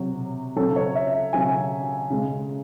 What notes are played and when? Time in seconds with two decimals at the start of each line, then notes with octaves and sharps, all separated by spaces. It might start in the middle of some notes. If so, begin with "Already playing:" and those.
Already playing: C3 F#3
0.56 C#3 F#3 A4
0.76 C#5
0.95 E5
1.33 C#3 F#3 G#5
2.10 C#3 G#3